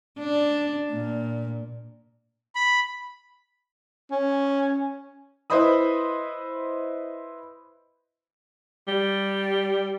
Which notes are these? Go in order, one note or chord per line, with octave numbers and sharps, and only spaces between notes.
D4
A#2
B5
C#4
E4 B4 C5 D#5 B5 D#6
G3